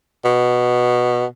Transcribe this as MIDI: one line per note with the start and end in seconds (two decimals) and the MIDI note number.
0.24 1.25 47